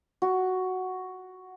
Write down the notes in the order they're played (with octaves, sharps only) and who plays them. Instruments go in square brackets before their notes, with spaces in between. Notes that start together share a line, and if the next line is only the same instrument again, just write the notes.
[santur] F#4